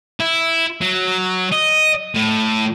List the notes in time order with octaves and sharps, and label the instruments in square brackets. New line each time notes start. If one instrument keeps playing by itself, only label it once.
[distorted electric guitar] E4
F#3
D#5
A2